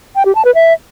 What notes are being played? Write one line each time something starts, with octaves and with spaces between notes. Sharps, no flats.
G5
G4
A5
B4
E5